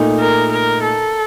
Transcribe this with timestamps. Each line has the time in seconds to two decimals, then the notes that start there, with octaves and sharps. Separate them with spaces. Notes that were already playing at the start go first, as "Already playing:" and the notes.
Already playing: A#2 A3 D#4
0.20 A#4
0.51 A#4
0.83 A4